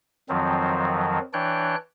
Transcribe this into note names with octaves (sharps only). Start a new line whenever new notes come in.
F2 D#3 F3 F#3 C4
E3 D4 C#5 G5 F#6